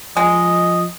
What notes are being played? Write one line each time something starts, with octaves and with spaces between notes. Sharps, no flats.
F3 G#3 D#5